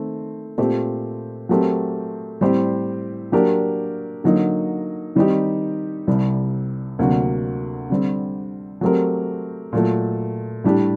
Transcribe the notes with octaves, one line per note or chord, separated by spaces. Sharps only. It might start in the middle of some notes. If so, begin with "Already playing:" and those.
Already playing: D#3 A3 C4
A#2 A3 C4 G4 C5
F#3 A3 C4 G4 A#4
A2 G3 C4 G4 C5
F#3 A#3 D4 G4 A#4
D3 F#3 A#3 D#4
D#3 G3 C4 D#4 G4
C2 C3 G3
D2 C3 F#3 A#3 F#4
D3 G3 C4
F#3 A3 C4 G4 A#4
A#2 F#3 A3
A2 G3 D4 G4